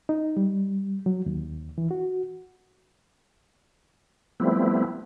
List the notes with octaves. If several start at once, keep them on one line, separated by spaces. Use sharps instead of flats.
D#4
G3
F#3
D#2
E3
F#4
F3 G3 A3 B3 C4 E4